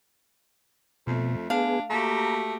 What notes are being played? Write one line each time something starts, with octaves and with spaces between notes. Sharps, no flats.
F2 B2 A3
B3 D4 G#4 F5
A3 A#3 F#4 G4 A#5